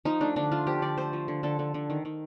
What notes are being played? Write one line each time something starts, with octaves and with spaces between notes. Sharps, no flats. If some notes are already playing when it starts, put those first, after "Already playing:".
F3 D#4
A3 D4
D3 D4
A3 F4
F3 G4
D3 D5
A3 C5
F3
D3
D3 A4
D3
D3
D#3
D#3